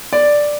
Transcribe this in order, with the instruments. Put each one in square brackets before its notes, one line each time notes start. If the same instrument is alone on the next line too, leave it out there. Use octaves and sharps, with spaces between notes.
[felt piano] D5